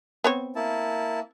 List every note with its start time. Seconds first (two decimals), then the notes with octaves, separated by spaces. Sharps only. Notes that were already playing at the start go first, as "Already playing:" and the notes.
0.24 B3 C4 C#5
0.56 A#3 E4 A5